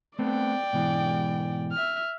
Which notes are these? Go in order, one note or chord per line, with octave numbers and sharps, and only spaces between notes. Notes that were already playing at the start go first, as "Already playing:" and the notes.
A3 B3 C4 D5 G5
G#2 B2 E3
E5 F6